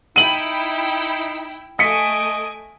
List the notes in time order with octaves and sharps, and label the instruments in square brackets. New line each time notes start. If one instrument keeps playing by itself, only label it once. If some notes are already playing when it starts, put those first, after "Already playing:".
[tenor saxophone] D#4 [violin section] E4 G5 [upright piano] D#7 F#7
[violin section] A3 G#5 D7 [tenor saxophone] D#5 [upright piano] B6 C#7